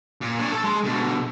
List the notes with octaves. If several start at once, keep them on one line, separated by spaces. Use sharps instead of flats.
A#2
D4 C#5
A4 A5
G#3 C6
B2 D3